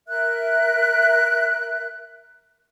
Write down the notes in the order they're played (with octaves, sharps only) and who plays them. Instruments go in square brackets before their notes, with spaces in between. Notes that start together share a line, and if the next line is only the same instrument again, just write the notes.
[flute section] A#4 E5 F#6